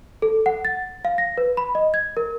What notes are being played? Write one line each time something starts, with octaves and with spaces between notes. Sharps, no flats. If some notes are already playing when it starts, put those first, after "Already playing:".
A4
F#5
A6
F5
A#6
B4
B5
D#5
G#6
A#4